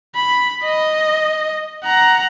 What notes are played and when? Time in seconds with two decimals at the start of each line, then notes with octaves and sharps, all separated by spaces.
0.15 B5
0.64 D#5
1.84 F#5 A#5